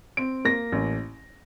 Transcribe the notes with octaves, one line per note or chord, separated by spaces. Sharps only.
C4 D7
A#3 A#6
A1